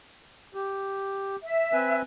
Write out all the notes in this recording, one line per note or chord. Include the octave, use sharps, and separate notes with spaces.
G4
E5
C4 B4 G#5